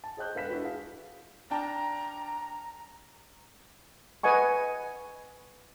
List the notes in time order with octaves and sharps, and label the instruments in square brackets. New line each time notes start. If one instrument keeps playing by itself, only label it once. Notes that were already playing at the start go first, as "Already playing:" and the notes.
[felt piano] A5
G#4 C5 D#5 G5 F#6 G6
E1 B4 F5 B6 E7
D4 E4 F#4 B4
G#4 F5
[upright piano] D4 G5 A5 [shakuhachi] A#5
[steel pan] B4 D#5 F#5 G#5 C#6